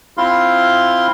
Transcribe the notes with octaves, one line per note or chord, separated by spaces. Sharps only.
C4 E4 F4 F5 C6